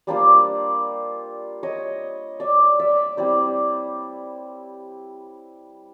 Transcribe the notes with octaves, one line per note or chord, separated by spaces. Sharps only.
G3 A#3 D4 F4 C5 D5
C#5 D#5
D5 E5
D5 E5
G3 C4 E4 C5 D5